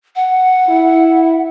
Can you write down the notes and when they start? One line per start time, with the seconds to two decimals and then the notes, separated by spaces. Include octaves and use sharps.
0.16 F#5
0.67 E4